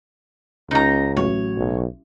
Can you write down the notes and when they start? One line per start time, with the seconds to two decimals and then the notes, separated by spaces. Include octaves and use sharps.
0.71 C#2 C#3 D#4 A#5
1.17 A1 F#3 C#5
1.57 B1